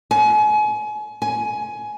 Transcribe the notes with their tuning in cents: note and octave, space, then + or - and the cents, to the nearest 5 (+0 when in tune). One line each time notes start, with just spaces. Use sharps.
G#5 +35
G#5 +15